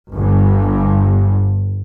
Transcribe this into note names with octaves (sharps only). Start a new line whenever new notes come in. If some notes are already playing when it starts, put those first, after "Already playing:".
G1 G2